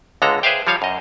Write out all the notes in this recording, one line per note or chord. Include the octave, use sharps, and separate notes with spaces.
C#2 D3 G#3 A4 A#5
G#4 B4 C5 E5 F5 G5
F3 G3 C#5 F5
F#2 D#5